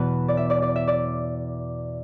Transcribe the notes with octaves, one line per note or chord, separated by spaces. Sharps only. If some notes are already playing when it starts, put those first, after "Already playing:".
Already playing: E2 B2 B3 B4
D5
E5
D5
D5
E5
D5